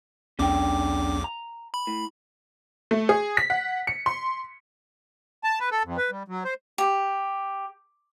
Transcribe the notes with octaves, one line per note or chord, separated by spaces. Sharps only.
B1 E2 C#4 D4 G5 D6
A#5
B5
A2
A3
G#4
B6
F#5
C#7
C6
A5
B4
A4
F2
B4
G3
F#3
C5
G4